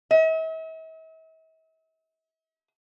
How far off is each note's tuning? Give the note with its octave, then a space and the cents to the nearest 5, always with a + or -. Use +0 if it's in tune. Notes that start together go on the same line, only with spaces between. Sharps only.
E5 -45